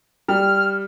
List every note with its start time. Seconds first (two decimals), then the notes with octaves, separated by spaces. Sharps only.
0.28 G3 F6